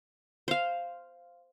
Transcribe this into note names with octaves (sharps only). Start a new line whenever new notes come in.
C5 F5